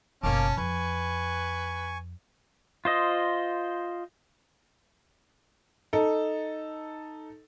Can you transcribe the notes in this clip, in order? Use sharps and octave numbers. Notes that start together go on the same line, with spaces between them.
F#1 B2 A#3 C#4 A5 D6 F6
F2 B4 G#5 C#6
F4 C5 D#5
D#4 A4